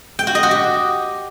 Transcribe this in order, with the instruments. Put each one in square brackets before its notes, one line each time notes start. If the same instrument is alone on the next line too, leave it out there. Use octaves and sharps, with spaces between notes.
[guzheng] G5
F#4
D#5
F#4
G4